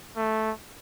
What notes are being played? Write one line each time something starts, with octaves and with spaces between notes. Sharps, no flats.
A3